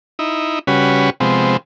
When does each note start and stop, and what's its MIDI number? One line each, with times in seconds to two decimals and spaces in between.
0.19 0.59 63
0.19 0.59 64
0.67 1.10 49
0.67 1.10 55
0.67 1.10 61
0.67 1.10 66
0.67 1.10 71
1.20 1.57 48
1.20 1.57 53
1.20 1.57 56
1.20 1.57 59
1.20 1.57 60